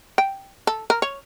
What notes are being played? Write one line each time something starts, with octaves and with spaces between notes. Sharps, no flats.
G5
A4
A#4
C#5